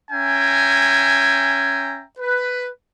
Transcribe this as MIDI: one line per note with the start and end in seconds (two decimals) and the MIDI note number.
0.11 2.04 61
0.11 2.04 76
0.11 2.04 79
0.11 2.04 80
0.11 2.04 82
2.19 2.68 71